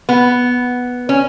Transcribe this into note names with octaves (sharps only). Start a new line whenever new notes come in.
B3
C#4